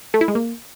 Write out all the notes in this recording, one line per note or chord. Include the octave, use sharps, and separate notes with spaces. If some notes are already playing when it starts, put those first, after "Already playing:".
A3
E4
G#3
A#3